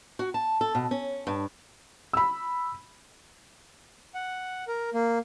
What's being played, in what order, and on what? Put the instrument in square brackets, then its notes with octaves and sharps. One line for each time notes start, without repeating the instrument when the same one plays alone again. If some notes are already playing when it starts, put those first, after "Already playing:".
[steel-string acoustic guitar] F#4
A5
A4
B2
C#4
G2
[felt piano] B5 E6
[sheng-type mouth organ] F#5
A#4
A#3